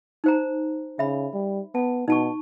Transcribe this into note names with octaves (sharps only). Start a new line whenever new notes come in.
D#4 C5 A#5
C#3 E5 B5
G3
B3 A5
B2 D#4 A5 C#6